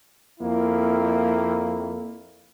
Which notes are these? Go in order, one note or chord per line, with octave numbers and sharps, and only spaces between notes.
F2 A#3 E4